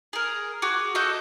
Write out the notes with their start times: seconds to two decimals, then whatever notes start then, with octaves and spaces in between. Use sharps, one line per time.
0.13 G#4 A#4
0.62 F#4 G#4 D6
0.95 F#4 A4 D#5 G6